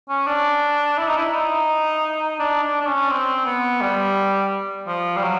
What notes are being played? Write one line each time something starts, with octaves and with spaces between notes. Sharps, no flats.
C#4
D4
E4
D#4
E4
D#4
D4
D4
D4
C#4
C4
B3
G3
F3
G3
F#3